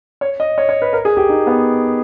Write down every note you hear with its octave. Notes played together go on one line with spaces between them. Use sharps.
C#5
D#5
C#5
C#5
B4
A#4
G#4
G4
D#4
B3